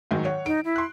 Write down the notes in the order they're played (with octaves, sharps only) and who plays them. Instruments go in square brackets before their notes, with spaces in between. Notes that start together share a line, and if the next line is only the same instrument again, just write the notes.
[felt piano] G#2 D#3 F#3
C#5 F#5
[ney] D#4 [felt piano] D7
[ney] E4
[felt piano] C6 F#6